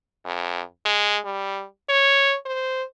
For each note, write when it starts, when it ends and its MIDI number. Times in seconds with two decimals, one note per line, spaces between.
0.25 0.61 41
0.85 1.19 56
1.25 1.64 55
1.89 2.36 73
2.45 2.83 72